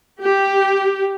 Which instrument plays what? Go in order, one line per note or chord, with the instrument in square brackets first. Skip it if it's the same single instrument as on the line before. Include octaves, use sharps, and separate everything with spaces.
[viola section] G4